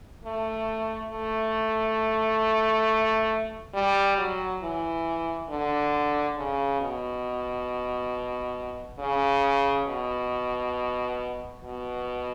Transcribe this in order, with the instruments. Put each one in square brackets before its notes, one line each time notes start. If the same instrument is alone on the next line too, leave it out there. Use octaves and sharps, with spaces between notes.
[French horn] A3
A3
G3
F#3
E3
D3
C#3
B2
C#3
B2
B2